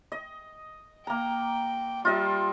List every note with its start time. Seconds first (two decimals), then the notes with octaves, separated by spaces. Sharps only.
0.12 D#5
1.07 A#3 G5 A#5
2.05 G3 F4 D#5 E5